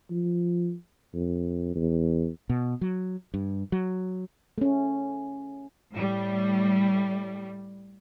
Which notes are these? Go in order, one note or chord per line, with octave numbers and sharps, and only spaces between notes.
F3
F2
E2
B2
F#3
G2
F#3
A3 C#4
A2 G3